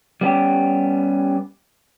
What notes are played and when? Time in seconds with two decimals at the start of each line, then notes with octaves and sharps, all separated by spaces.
0.21 G3 B3 C#4 G4